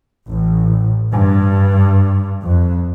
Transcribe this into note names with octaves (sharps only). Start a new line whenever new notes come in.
A1
G2
F2